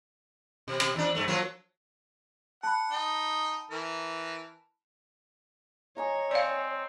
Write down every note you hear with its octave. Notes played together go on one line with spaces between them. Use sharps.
B2
B2
E2 D4
G2 A3
F3 F#3 A#3
F#5 A5 B5
D#4 G5
E3 A#4
C#5 D#5 G#5 A#5
C4 D5 F5